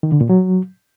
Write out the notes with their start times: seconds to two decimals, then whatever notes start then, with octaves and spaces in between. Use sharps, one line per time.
0.03 D#3
0.12 D3
0.21 A#2
0.29 F#3